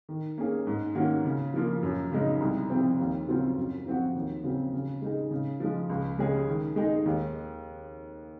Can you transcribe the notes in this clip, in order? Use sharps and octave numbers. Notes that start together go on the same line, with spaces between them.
D#3
A#3 C#4 G#4
G#2
D#3 A#3 C#4 F#4
C#3
F3 A#3 F4
F#2
C#3 G#3 D#4
C2
C3 F3 C4
D#2
C#3 F#3 C4 F4
F#2
F3 C4 F#4
D#2
C#3 F#3 C4
C#3
G#3 D#4 G#4
C#3
F3 G#3
C#2
C#3 G#3 C#4 G#4
D#3
G#3 D#4 G#4
D#2